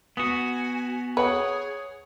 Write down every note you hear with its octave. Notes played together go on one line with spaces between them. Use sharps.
B3 F#4 G#5 D#6
G#4 B4 C#5 F#5